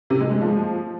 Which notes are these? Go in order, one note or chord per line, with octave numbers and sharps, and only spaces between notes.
C3
G#3
G#2
F3